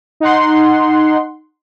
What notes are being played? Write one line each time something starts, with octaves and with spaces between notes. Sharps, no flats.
D#4 F#5 C6